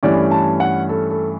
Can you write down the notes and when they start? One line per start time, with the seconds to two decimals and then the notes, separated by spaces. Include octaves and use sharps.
0.03 G2 E3 A3 C#4 D5
0.31 A5
0.60 F#5
0.89 A4
1.10 A4